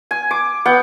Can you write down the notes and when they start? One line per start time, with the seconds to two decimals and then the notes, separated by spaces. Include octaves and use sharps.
0.11 G#5
0.31 D6
0.66 B3 F#5 G5